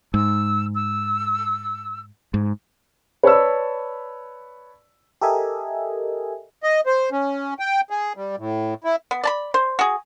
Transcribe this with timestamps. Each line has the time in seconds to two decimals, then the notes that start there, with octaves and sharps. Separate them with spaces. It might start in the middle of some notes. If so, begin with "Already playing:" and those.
0.14 G#2 E6
0.74 E6
2.34 G#2
3.23 B4 C#5 D5 A5 B5 E6
5.21 G4 A4 A#4 D#5 E5 G#5
6.63 D#5
6.86 C5
7.12 C#4
7.59 G5
7.90 G#4
8.17 G3
8.38 A2
8.84 E4
9.11 B3
9.23 D5 A5 B5
9.54 C5
9.79 F#4 G#4